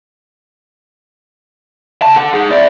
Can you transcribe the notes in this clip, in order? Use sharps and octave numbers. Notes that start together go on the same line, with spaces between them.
C#3 A5
A4 F#5
D#4 G#4
E4 D5